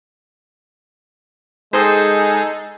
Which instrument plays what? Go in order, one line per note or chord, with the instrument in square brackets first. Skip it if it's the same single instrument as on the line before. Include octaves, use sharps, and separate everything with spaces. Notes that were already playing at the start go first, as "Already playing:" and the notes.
[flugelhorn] G#3 [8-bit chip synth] D#4 G#4 A4 [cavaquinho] C5 D#5 G5